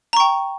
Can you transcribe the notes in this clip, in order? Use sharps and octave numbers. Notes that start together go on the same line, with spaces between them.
G5 A#5 C#6